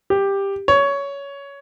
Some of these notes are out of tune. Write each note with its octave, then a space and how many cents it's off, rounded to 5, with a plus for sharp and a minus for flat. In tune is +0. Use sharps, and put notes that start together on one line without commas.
G4 +10
C#5 +15